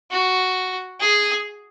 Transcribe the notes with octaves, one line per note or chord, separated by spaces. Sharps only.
F#4
G#4